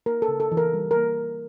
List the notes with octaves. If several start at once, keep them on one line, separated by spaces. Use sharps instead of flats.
A#3 A#4
A4
C#3
A4
E3
A#4
G3
A#4
A#3